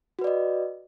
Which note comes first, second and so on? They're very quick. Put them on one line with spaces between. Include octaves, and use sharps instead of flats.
F#4 B4 D5 D#5